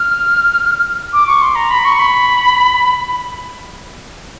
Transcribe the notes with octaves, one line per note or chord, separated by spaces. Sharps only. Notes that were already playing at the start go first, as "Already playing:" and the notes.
Already playing: F6
D6
C#6
C6
A#5
B5
C#6
B5